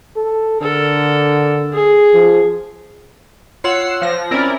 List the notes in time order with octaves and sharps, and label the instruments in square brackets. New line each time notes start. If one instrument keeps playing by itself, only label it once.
[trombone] A4
[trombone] D3 [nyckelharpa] A4 A#4
[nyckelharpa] G#4
[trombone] F3
[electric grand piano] F4 C#5 C6 [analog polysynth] F#5 E6 C7
[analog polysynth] F3 A#6
[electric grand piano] C4 C#4 [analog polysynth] E4 A#4 D5